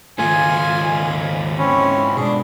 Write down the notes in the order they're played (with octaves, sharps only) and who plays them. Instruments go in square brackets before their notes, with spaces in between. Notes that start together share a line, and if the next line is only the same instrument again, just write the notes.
[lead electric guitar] G#2 F4 [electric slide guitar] D#3 A#3 A4 [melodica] F5 C6 [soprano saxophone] G#5
[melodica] C4 E4 F#4 [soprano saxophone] C#4
[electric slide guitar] B2 [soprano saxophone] D4 [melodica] G#4